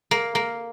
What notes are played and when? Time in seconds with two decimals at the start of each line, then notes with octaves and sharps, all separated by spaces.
0.11 A#3
0.35 A#3